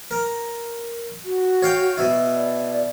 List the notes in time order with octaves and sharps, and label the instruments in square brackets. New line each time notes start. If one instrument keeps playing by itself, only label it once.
[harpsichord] A#4
[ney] F#4
[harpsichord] C#5 F5 G5
B2 E4
[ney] D5